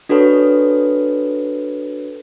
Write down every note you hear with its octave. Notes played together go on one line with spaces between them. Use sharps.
D4 F#4 A4 B4 C#5